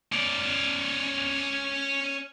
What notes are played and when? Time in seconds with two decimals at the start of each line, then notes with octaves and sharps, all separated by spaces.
0.12 C#4 D5